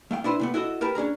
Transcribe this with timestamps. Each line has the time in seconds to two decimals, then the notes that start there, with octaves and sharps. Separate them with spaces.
0.11 A3 F5 G5
0.24 D4 E4 B4 C5
0.39 C3 A3 B3
0.54 E4 F#4 A4 D#5
0.81 G4 A#4 B4 A5
0.95 C#4 D4 G#4 A#5